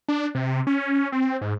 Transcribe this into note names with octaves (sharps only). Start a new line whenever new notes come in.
D4
C3
C#4
C4
G#2